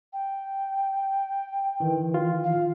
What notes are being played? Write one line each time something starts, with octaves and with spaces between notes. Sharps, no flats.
G5
D#3 E3
F4
F5